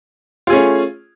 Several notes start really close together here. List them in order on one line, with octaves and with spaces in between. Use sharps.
F4 G#4 C#4 A3